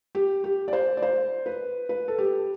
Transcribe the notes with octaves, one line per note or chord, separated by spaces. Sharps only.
G4
G4
D5
C5
D5
C5
B4
B4
A4
G4